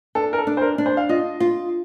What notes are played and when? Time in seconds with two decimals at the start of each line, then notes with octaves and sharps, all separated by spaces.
0.15 D4 A4
0.33 A#4
0.38 A4
0.47 D4
0.57 C5
0.62 A#4
0.78 D4
0.86 C5
0.97 F5
1.09 F4 D#5
1.40 F4